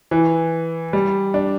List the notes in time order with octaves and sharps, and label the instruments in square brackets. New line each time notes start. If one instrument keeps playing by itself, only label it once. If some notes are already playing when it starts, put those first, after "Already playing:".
[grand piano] E3
G3
D4